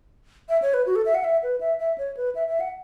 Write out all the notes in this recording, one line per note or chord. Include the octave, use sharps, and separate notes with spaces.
E5
C#5
B4
F#4
A4
E5
F#5
E5
B4
E5
E5
C#5
B4
E5
E5
F#5